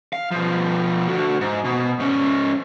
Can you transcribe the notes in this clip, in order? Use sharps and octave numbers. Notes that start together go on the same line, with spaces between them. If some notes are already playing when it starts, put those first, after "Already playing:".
F5
B2 F3
D3 F#4
G#2
B2
G#2 C#4